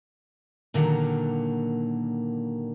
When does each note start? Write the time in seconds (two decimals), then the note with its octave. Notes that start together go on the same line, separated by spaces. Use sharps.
0.74 A#2 D3 D#3 F#3 A#3